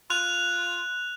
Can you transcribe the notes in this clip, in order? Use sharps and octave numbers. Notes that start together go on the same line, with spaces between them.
F4 F#6 F7